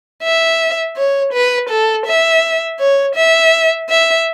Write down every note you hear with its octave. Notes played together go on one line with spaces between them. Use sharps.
E5
C#5
B4
A4
E5
C#5
E5
E5